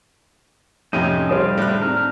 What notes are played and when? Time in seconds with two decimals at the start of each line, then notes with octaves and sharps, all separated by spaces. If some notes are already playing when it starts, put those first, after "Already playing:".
0.93 F2 A2 C3 C#4 D#4 D#6
1.29 D3 G3 G#4 C5 F5 D#6
1.57 A2 F#6
1.81 C4 D4 D#4 A#5 F6